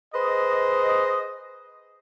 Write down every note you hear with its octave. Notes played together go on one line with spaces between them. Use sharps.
G#4 B4 C5 D#5